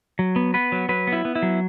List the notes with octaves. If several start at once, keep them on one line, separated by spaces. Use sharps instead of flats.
F#3
B3
B3 B4
F#3
F#3 B4
B3
E4
B3
E4
F#3